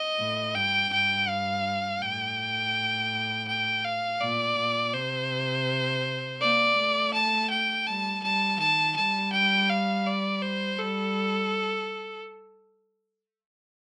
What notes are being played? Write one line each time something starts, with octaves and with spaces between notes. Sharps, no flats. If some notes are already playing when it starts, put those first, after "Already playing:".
Already playing: D#5
A2
G2 G5
G2 G5
F5
A2 G5
G5
F5
A#2 D5
A#2
C3 C5
A#3 D5
A3
A5
G5
G3 A5
G3 A5
D#3 A5
G3 A5
G5
F5
D5
C5
G3 A4